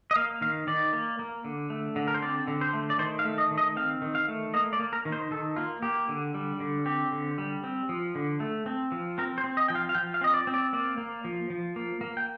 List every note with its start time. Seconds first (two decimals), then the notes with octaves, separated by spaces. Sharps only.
0.11 D#5
0.16 A#3 F5
0.41 D#3 F5
0.67 D#3 D5
0.93 A#3
1.19 A#3
1.44 D3
1.70 A3
1.96 D3
2.08 A#4
2.14 C5
2.22 C4 D5
2.48 D3
2.61 C5
2.73 A3
2.90 D5
2.99 D#3 C5
3.19 F5
3.25 A3
3.38 D#5
3.51 D#3
3.58 D#5
3.76 C4 F5
4.02 D#3
4.15 F5
4.28 A3
4.54 A#3 D#5
4.73 D5
4.80 A#3
4.93 A#4
5.05 D#3
5.12 C5
5.31 D#3 A4
5.56 A#3 F4
5.82 A#3 G4
6.09 D3
6.34 G3
6.60 D3
6.86 C4 G4
7.12 D3
7.38 G3
7.64 C4
7.89 F3
8.15 D3
8.40 A3
8.66 C4
8.92 F3
9.18 C4 A#4
9.38 C5
9.44 C4
9.57 D#5
9.68 F3 G5
9.75 F5
9.89 F5
9.95 F3 G5
10.14 F5
10.21 C4 D#5
10.34 D5
10.47 C4
10.54 D5
10.73 A#3 D5
10.98 A#3
11.25 F3
11.50 F3
11.76 A#3
12.01 A#3
12.17 G5